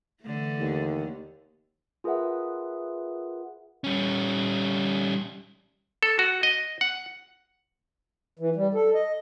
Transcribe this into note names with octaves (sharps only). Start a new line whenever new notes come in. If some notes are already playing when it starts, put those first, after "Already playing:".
D3 E3 A3
D#2
F4 G#4 A#4 B4 E5 F#5
G3 C#4
A4
F#4
D#5
F#5
E3
G3
A4
D#5